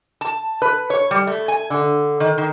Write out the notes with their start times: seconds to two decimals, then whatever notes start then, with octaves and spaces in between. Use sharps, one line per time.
0.21 A5
0.62 B4
0.90 C#5
1.11 G3
1.27 A3
1.48 G#5
1.70 D3
2.20 D#3
2.38 D#3